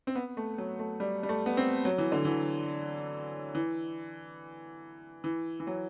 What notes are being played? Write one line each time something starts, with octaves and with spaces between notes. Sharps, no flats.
C4
B3
A3
F#3
A3
G3
G3
A3
B3
C4
F#3
E3
D3
E3
E3
E3
E3
F#3